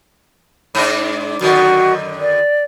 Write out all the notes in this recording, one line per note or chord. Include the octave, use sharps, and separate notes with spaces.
G#2 D4
F#2 D3 D#3 F#4
D5